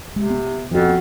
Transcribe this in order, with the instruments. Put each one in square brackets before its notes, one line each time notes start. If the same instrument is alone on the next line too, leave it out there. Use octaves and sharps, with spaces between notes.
[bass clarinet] C3 [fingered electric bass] G#3
[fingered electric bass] B3
[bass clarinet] F2 [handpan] F3 F#4